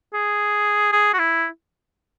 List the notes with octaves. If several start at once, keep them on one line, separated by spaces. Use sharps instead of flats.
G#4
G#4
F#4
E4